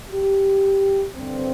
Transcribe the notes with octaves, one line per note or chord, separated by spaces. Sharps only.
G4
G2 D3 C4